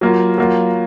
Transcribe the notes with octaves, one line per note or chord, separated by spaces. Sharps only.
F#3 A#3 F4
F#3 A#3 F4